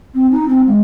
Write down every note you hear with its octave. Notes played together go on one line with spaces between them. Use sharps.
C4
D#4
C4
G#3